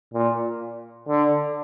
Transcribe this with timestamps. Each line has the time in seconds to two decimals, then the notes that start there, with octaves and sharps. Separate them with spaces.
0.13 A#2
1.08 D3